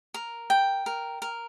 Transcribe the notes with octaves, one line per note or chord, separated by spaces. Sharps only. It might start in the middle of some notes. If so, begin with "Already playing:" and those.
A#4
G5
A#4
A#4